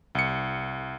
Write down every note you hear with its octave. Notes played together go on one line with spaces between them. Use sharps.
C2 C#7